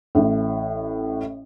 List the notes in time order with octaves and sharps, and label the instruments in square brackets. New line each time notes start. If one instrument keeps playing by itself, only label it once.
[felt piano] A1 A2